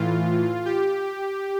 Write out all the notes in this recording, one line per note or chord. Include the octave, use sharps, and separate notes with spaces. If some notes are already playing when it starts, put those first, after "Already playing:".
Already playing: A2 E3 F4
G4